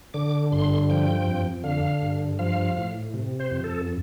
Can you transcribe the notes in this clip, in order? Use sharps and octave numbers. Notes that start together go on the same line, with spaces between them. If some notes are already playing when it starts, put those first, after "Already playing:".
D3 D6
G2 C6
F3 G5
F2
D3 F5
G2
F3 F5
A2
C3
C5
F2
A4